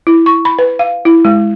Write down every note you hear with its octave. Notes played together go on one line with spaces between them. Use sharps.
E4
C#6
B5
B4
F5
E4
G#3